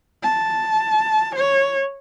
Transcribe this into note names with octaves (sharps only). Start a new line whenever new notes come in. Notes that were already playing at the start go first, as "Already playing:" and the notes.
A5
C#5